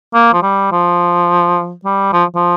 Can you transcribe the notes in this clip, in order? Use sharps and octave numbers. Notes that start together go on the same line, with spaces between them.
A#3
F3
G3
F3
G3
F3
F3